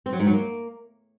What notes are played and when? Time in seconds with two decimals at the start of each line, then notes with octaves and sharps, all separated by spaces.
0.06 C4
0.13 F#3
0.20 G#2
0.26 F#3
0.33 A#3